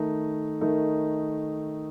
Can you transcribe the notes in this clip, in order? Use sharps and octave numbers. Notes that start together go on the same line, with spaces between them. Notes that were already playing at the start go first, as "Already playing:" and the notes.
Already playing: D#3 A3 D#4
D#3 A3 D#4